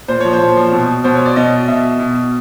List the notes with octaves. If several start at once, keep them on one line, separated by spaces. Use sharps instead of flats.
A#2 C5
F3 C#5
C5
A#2
F3
B2
B2 C5
C#5
D5
B2 D#5
B2 E5
B2